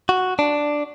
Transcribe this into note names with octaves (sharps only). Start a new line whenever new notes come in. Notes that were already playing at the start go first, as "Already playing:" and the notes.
F#4
D4